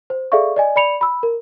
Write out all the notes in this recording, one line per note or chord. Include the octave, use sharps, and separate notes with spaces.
C5
G#4 A4 D5 E5 F5 C#6
D5 D#5 G#5
D5 B5 C#7 F7
B5 E6
A#4